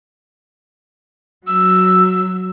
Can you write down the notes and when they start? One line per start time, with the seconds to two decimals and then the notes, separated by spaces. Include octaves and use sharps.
1.47 F#3 E6